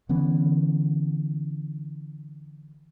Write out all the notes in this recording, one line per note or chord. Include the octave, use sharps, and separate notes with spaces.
D3 E3 B3 C#4